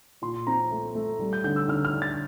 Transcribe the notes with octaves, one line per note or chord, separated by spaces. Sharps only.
A#2 C6
C4 A#5
A3
A3
G3
G6
D3 G6
E6
D3 F6
F6
D4
A6